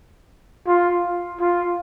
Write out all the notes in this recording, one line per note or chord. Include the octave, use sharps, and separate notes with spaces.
F4
F4